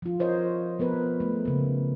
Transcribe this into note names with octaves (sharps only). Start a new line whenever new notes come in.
F3 F4
A#4 C5 C#5 D#5
F3 B3 A#4 B4
A3
C#3 A#3